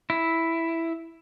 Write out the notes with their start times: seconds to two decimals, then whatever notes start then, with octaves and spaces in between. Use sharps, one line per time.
0.10 E4